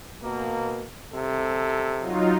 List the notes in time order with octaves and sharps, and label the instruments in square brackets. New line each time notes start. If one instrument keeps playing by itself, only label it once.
[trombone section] B2 A#3
C2 C3 A4
[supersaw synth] F#3 D#4 F4